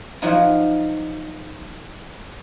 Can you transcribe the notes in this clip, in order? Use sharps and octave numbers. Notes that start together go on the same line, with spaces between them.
F3 F#3 D#4 F4